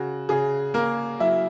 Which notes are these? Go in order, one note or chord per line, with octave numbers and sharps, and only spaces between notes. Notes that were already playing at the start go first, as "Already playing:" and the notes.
Already playing: C#3 F#4
C#3 G#4
A#3 A#4
F#3 E4 E5